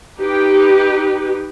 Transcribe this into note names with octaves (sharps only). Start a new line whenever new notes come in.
D#4 G4 B4